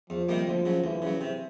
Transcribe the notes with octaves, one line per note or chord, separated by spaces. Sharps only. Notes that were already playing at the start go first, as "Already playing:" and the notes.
E2 F3
C3 D#3 G3 A#3
D2 F3
C#3 F#3
D2 E3
C#3 F#3
C3